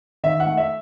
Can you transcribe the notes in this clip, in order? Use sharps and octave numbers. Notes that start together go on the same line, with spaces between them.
D#3 E5
F#5
A3
E5